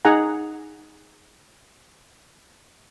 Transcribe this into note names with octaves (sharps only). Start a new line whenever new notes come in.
D#4 G#4 F#5 G#5 A#5